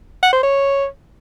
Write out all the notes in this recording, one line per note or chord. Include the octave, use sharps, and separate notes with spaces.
F#5
C5
C#5